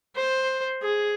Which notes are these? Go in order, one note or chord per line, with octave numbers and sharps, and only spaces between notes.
C5
G#4